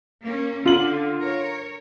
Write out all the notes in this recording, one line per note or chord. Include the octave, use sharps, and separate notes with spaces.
A#3 C#4
D3 F4 F#7
A#4 C#5